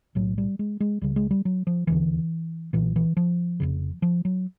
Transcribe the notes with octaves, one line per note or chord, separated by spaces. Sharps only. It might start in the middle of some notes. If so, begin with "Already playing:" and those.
B1 A2 F#3
G3
G#3
G#3
C#2 C#3 G3
G#3
G3
F#3
F3
E1 D#2 D3 E3
B1 A#2 E3
E3
F3
F1 F2 C#3
F3
F#3